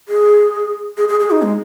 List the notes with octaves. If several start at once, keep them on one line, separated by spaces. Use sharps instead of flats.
G#4
G#4
G#4
G#4
D#4
G#3